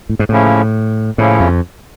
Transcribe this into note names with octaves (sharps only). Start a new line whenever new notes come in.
A2
G#2
A2 C#3 F3 A#3 C#4 E4
A2 C#3 F3 A#3 C#4 E4
F2